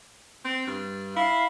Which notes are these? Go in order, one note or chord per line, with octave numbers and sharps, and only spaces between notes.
C4
G2
E4 F5